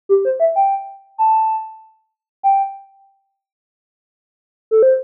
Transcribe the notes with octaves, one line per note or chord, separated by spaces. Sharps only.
G4
C5
E5
G5
A5
G5
A4
C5